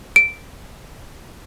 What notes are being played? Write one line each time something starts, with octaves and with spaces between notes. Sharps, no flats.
D7